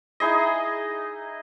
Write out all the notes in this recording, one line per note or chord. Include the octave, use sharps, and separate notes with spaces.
D#4 E4 G#4 D#5